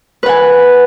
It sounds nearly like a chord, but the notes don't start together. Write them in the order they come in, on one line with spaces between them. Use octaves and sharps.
B4 F#5 G#5